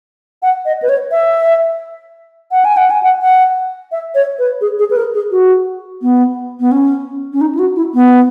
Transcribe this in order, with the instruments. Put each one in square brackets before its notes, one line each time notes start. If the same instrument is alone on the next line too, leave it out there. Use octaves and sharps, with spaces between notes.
[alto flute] F#5
D#5
B4
C#5
E5
F#5
G#5
F#5
G#5
F#5
F#5
E5
C#5
B4
G#4
G#4
B4
A#4
G#4
F#4
B3
B3
C#4
C#4
D#4
E4
F#4
E4
B3